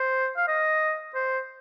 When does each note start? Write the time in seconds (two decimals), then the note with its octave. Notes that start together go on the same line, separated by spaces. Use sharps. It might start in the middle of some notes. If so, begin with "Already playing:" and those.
Already playing: C5
0.37 F5
0.48 D#5
1.15 C5